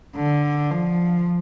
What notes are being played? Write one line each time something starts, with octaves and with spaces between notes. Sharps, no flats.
D3
F3